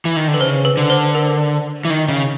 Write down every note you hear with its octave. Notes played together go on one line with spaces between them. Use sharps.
E3
D#3
D3
B4
C#3 C5
B4
D3
C5
A#4
E3
D#3
C#3